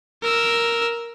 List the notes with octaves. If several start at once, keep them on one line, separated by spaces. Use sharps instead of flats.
A#4 E6